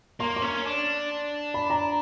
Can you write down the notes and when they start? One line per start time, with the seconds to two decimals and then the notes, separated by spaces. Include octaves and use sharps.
0.20 A#3 C6
0.36 C6
0.42 C#4
0.65 D4
1.54 B5
1.70 A#5